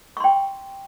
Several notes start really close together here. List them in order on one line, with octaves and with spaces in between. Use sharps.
C#6 C6 G5